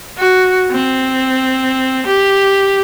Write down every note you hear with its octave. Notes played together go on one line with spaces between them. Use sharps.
F#4
C4
G4